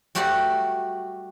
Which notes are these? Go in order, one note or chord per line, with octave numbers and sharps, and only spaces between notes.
G3 A3 F#4 G4 D5 F#5